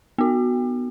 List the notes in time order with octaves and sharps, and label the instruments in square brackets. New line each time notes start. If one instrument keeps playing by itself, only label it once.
[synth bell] B3 F#4